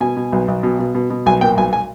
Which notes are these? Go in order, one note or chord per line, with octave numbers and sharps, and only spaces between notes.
B2 G#5
B2
B1
B1
B2
B2
B2
B2
B1 G#5
A#2 G5
B1 G#5
G#5